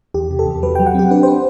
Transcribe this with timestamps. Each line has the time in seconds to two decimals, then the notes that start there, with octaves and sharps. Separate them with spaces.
0.14 E2 G4
0.31 C3
0.39 A4
0.47 E2
0.62 F#3 B4
0.75 F#3 G5
0.86 F#5
0.94 C4 G4
1.11 D4 B4
1.23 C5
1.28 D4